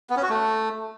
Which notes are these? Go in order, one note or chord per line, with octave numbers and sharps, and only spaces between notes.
B3
C#4
F#4
A3